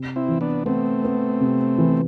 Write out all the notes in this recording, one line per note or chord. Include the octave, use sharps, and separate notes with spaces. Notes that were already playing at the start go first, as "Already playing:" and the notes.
Already playing: C3
C4 E4
E3
B3 D4
A3 B3 C4
B3
C3
E3